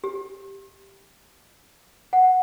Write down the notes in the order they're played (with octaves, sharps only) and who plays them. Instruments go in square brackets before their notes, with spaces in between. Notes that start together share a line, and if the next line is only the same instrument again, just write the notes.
[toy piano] G4
F#5